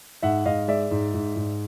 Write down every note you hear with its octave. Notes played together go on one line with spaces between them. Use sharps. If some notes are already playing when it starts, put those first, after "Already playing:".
G#2 E5 F#5
G#2 D#5 F5
G#3 D5 E5
G#2
G#2
G#2